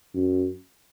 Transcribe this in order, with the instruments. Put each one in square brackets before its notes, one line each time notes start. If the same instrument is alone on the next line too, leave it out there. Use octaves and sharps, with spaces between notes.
[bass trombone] F#2